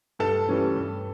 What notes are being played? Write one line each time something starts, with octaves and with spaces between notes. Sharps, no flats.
G2 A4 A5
E3 G3 C#4
G2